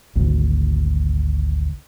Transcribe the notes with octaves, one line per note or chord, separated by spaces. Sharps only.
G#1 D2